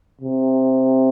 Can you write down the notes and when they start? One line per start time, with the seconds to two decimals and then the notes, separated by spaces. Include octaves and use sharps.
0.21 C3